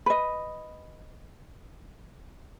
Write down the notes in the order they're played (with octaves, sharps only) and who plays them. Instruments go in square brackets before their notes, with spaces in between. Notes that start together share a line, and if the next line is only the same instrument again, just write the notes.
[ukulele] B4 D#5